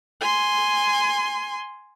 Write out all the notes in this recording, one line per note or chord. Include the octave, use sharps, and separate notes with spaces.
G#5 C6